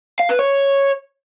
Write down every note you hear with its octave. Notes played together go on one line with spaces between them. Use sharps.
F5
B4
C#5